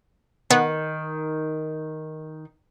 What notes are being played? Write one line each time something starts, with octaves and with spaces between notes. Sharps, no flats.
D#3 B3